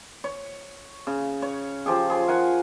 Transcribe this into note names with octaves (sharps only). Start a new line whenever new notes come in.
C#5
C#3
C#5
F3 G4 G#4
G#4 C6
A#4 F#5 G#5